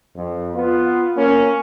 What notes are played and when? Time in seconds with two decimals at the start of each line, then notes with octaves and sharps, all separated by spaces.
0.15 F2
0.55 B3 F4
1.16 A#3 C#4